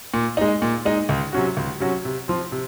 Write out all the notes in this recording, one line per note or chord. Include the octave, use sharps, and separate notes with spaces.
A#2
G#3 D#4
A#2
G#3 D#4
C#2
C3 F#3 C#4 F#4
C#2
C3 F#3 C#4 F#4
C3
F3 C4
C3